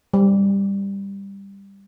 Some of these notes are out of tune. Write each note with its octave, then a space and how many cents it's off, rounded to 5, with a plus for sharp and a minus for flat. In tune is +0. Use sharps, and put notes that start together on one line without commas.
G3 +10